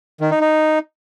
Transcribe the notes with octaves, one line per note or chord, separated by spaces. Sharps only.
D#3
D#4
D#4